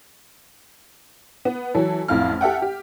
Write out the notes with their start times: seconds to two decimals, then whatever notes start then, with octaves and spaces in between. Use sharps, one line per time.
1.45 B3
1.74 E3 F#3 E4 A4
2.08 A1 F2 E4 F5 F6
2.41 G4 A4 E5 F#5 G5
2.62 G4